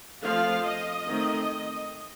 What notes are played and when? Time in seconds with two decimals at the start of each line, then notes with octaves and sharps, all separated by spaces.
0.23 F3 A3 C4 F5
0.65 D#5
1.06 D#3 A3 C4